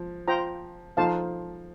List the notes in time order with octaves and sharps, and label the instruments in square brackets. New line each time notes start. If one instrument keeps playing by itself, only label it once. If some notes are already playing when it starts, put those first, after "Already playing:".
Already playing: [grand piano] F3
[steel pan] F4 C5 G5 A#5
[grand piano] F3 [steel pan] D#4 A4 C5 F5 A5